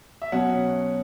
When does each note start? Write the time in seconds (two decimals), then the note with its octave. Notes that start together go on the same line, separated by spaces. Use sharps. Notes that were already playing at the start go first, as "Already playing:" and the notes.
0.22 E5
0.32 B2 F#3 C#4 F#5